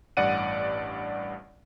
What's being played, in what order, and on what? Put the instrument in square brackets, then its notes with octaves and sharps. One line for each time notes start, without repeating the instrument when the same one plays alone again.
[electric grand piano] A1 G2 D5 F#5 D#7